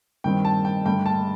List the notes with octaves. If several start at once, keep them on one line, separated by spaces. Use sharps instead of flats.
G2 D#3 G3 C4 G5
A5
G5
G2 D3 A3 G5
A5